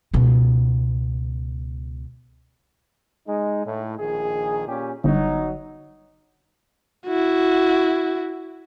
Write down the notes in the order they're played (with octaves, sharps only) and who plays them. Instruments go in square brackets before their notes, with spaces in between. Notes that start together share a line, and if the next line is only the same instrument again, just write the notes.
[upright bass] C#2 B2
[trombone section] G#3 D#4
A2
A#1 D#3 G#4
A#2 C#4 G4
[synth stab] G1 [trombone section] F#3 D#4
[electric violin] E4 F#4